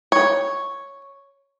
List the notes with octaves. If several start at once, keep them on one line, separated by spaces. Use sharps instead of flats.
C#5